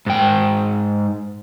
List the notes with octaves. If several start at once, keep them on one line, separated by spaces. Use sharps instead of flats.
G#2 G5